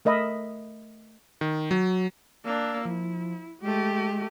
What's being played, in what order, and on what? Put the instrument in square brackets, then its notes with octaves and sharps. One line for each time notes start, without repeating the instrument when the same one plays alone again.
[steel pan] A3 A#4 D#5 E5 B5
[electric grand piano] D#3
F#3
[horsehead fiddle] A#3 D4 [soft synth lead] E6
[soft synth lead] F3 [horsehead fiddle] E4
[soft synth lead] G#3 [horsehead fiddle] A3 G4